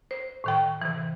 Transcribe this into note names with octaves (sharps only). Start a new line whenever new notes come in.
C5
A2 D#3 G5
C3 E3